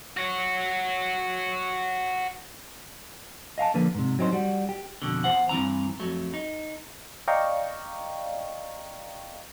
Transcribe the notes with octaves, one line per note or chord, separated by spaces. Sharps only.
F#4 C#5
D#5 F5 G#5 A5
D3 F3 A#3 B4
G#2 C3
F#3 C4 D#4 C5
G3 F#4
G4
F2 B2 D3
E2 G#2 C5 F#5
G2 E3 C4 A#5
F2 F#3 A3
D#4
D5 D#5 F5 G5 A#5 C#6